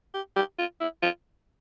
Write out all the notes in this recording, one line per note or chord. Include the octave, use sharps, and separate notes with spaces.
G4
G4
F4
E4
F4